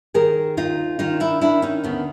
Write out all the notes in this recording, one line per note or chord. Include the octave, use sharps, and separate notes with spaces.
D#3 G#4 A#4
D#2 D#4 F4
D#3 D#4 F4
D4 E4
D#3 D4 E4
C#4 D#4
D2 B3 C#4